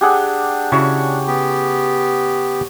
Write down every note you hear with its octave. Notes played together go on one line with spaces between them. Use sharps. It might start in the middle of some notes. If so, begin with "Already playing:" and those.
D4 G4 G#4 F#5
C#3 E4 F#4 C#5
B3 G4